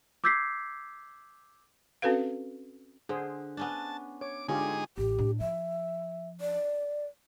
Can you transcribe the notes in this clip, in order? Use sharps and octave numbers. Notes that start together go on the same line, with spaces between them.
D6 E6 G6 G#6 B6 C7
C4 C#4 F#4 A4 B4 F5
D3 G#4 C5
B3 C#4 D4 A5
C#5 D6
D3 G#3 C#4 D#4 F4 G4 G#4
A1 G4
A2 D4
F3 E5
D5